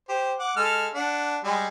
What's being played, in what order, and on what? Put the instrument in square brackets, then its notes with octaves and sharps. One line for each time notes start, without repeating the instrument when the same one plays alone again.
[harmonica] G4 C5
F#5 D6
G#3 A4 F6
D4 F#5
G3 G#3